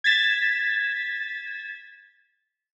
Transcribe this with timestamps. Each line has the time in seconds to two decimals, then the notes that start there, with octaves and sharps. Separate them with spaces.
0.04 G#6 A6 B6 E7